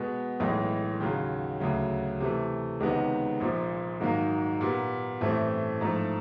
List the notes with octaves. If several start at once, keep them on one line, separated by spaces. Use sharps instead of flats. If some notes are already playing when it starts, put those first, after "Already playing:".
Already playing: B2 G#3 B3
B1 A2 E3 G#3
D#2 C#3 F#3
D2 C#3 F#3
C3 E3 A3
C#2 C3 D#3 G#3 B3
A#1 A#2 F3
G#2 D#3 F#3 A#3
A#2 G3 B3
A1 G2 E3 A3 C4
G#2 F3 A3